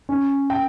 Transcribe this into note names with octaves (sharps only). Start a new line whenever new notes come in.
C#4
G5